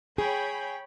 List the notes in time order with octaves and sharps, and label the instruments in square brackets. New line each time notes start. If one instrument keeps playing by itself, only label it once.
[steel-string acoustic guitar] G#4 [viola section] C#5 G5 B5